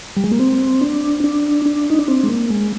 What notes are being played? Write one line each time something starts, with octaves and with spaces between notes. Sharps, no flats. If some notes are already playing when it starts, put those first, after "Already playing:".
G3
G#3
A#3
C4
D4
D4
D4
D#4
D4
C4
G#3
A#3
G#3